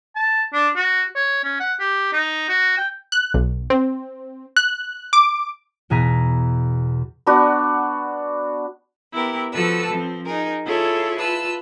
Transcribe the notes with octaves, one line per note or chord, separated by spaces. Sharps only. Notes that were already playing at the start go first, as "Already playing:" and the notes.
A5
D4
F#4
C#5
C#4
F#5
G4
D#4
F#4
G5
F#6
B1
C4
F#6
D6
E2 B2 G#4 A#5 B6
B3 D4 F#4
B3 E4 G4 A#4
F3 F#4 A4 B4 A5 E6
F3 C4
D#4 G#4 A#4
E4 F4 G#4 A4 C#5
F4 B4 A5 E6